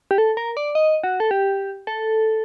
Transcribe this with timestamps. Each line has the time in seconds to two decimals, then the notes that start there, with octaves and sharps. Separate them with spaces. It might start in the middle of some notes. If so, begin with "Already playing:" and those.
0.11 G4
0.18 A4
0.37 A#4
0.57 D5
0.75 D#5
1.03 F#4
1.20 A4
1.31 G4
1.87 A4